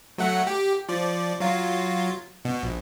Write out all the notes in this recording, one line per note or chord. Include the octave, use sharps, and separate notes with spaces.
F#3 A3 F#5
G4
F3 D5
F#3 F4
B2
A#1